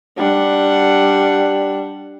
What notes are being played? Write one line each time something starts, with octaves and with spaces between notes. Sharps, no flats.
G3 D4 F#5